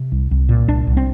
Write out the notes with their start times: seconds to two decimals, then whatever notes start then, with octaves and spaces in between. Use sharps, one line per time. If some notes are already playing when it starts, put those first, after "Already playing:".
Already playing: C3
0.12 C2
0.31 C2
0.49 A#2
0.68 C2 D4
0.87 C2
0.97 C4